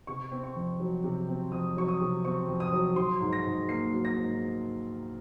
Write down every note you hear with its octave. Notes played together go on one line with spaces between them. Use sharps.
C3 C#6
C4
C#6
F2
F#3
C3
C4
F2 D#6
F#3 C#6
D#6
C3
C4 C#6
F2
D#6
F#3
F#3 C6
G#2
A#6
G#2
A#3 C7
F#3
A#6
G#2